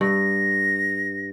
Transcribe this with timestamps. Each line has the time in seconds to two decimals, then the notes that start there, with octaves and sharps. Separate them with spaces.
0.01 G2 A#6